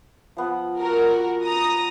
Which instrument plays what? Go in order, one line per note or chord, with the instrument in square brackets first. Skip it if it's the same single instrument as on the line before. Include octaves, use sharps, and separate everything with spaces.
[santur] F3 B3
[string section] F#4 A#4
A#5 D#6 A#6